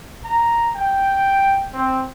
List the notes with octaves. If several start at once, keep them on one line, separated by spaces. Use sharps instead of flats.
A#5
G5
C4